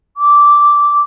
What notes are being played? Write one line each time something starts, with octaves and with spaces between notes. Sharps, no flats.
D6